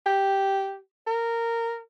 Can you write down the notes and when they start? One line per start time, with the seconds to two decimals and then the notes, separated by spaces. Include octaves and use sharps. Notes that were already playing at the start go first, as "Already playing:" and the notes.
0.06 G4
1.07 A#4